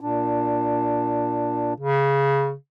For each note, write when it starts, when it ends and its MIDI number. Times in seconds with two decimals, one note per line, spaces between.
0.01 1.74 46
0.01 1.74 62
1.80 2.55 49